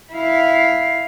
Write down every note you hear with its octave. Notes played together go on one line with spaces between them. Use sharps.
E4 F5